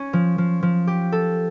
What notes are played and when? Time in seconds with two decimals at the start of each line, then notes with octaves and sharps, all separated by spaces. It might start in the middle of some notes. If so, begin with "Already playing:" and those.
Already playing: C#4 C#5
0.13 F3
0.38 F3
0.63 F3
0.87 G4
1.12 A4